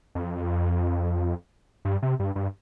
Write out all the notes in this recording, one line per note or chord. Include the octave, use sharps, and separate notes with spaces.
F2
G2
C3
G2
G2